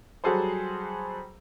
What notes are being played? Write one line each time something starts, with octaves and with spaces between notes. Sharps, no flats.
F#3 G3 F#4 G#4 A4 C5